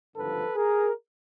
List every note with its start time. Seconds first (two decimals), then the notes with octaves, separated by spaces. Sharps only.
0.16 G#1 G2 D3 F3 A4 B4
0.56 G#4 A#4